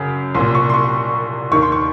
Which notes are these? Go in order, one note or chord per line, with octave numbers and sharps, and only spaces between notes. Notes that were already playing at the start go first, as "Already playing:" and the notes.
Already playing: F#2 C#3
C2 A#2 C6
C#6
C6
C#6
D#2 D#3 C#6
C6
C#6